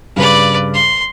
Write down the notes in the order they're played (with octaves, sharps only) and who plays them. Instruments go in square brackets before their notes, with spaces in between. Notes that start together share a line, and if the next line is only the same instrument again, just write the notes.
[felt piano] G2 C#3 [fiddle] B4 D5
[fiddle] C6